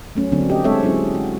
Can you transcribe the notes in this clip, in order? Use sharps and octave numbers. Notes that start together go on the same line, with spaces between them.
F#3 A3 C#4
D3 F#3 A#3 C4 D4
G4 D#5
G#3 C4 A4 C#5 E5
F#3 C#4 E4 G#4
F#4